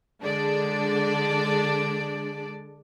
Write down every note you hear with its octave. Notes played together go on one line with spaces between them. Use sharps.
D3 G#3 D4 D5